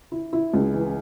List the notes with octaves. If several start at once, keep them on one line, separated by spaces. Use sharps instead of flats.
E4
E4
C#2
E3